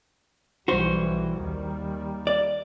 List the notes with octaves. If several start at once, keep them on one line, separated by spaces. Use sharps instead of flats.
B1 E3 G3 F#4 C5
D#2 D#3 G3
D5